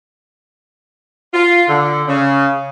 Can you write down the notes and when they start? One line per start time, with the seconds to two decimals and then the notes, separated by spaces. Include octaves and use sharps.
1.34 F4
1.69 D3
2.08 C#3